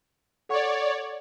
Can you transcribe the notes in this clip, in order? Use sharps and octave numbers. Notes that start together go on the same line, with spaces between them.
A4 C#5 D5 F#5 C#6